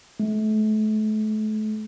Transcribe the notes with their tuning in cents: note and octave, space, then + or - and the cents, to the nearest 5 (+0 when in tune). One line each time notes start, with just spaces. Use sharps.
A3 -35